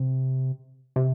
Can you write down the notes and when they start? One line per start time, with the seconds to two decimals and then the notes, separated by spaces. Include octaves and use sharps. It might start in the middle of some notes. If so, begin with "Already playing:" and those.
Already playing: C3
0.96 C3